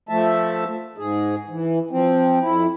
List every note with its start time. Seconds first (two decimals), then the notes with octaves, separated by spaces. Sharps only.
0.09 F3 A3 E5 A5
0.98 G#2 G#4
1.49 E3
1.91 F3 C4
2.41 F2 E4